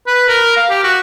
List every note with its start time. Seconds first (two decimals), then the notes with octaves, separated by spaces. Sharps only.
0.07 B4
0.28 A#4
0.56 F5
0.70 G4
0.83 F#4